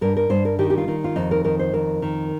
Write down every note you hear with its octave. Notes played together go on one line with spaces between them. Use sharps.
G2 A#4
A#4
G2 C5
A#4
D#3 G4
G4
F4
D#3
F4
F2 D#4
A#4
D#3 A#4
C5
F2 A#4
D#3